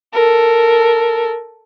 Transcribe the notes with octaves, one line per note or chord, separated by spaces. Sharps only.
A4 A#4